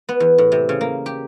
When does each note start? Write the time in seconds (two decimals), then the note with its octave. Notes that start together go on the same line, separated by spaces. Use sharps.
0.09 B3
0.20 E2
0.38 A2
0.52 C3
0.69 C#3
0.81 A#3
1.06 G4